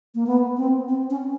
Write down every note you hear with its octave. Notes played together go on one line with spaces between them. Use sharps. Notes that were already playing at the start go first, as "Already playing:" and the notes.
A#3
B3
C4
C4
C#4